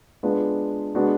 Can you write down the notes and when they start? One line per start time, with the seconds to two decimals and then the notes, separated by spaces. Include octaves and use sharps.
0.23 G#3 B3 D4 F4 B4
0.95 G#3 B3 D4 F#4